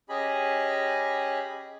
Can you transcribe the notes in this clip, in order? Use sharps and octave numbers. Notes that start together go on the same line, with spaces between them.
C#4 G4 G#4 D#5 G#5 B5